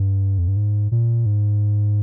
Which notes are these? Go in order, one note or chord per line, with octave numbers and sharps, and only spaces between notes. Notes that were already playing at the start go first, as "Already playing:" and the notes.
Already playing: G2
F2
G2
G#2
A#2
G#2